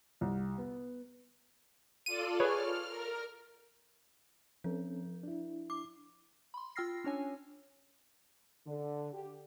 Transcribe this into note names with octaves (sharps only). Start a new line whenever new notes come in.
C2
B3
F4 A4 D5 D#7
G#4 B4 C#5 F6
A#4
F3 C4 C#4 A4
D4 E4
D6
B5 C6
F4 G5 E6 F6 A#6 C7
C#4 D4 C#5 G#5
D3
G4